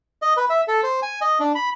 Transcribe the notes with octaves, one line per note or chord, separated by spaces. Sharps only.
D#5
B4
E5
A4
C5
G#5
D#5
D4
B5